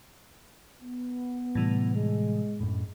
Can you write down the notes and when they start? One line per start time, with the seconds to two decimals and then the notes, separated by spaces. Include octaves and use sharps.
0.83 B3
1.55 A2 C3 E3 G3
1.95 G#3
2.60 F#2 A2